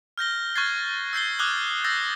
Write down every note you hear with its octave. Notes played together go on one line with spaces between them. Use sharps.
F6 G6 A#6 G7
C#6 F6 F#6 G#6 A6 C7
E6 G6 C7 G7
D6 D#6 F6 F#6 G#6 G7
E6 G6 A6 A#6 C7